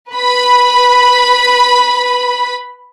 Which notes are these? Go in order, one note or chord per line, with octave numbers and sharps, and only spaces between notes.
B4 B5